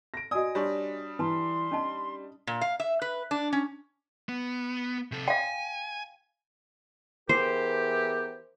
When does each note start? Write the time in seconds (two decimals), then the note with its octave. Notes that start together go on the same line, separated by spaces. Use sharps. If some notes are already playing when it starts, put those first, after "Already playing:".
0.14 A#6 D7
0.31 F#4 D5 D#5 G#5 D#6
0.55 G3 D4 C#5 C6 C#6
1.19 E3 B4 A5 A#5 C6
1.72 C#4 D#4 D#5 A5
2.47 A#2
2.61 F5
2.80 E5
3.02 B4
3.31 D4
3.53 C#4
4.29 B3
5.12 C3 A4
5.28 F5 G5 G#5
7.29 E3 B3 G4 G#4 A#4 C5